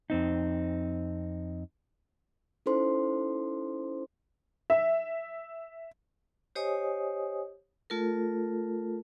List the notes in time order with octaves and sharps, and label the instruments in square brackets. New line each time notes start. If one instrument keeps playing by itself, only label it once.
[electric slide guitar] F2 C4 D#4
[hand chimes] C#4 D#4 E4 A4 C5 C6
[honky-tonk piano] E5
[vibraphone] G4 C5 C#5 D#5 G#5 D#6
A3 F4 A4 A#4